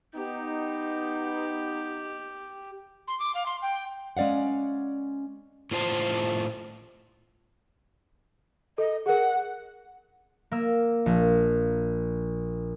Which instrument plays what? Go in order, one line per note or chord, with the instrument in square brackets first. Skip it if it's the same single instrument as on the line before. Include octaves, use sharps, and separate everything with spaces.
[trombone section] B3 D#4 [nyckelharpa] G4
[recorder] C6
D6
F5
C6
G5
[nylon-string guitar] G#3 C#4 D5 F5 F#5
[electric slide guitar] A2 F4 C5 G5 A5
[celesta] A4 [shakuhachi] D#5
[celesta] G#4 A#4 [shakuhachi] F#5
[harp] A#3 E6
A#1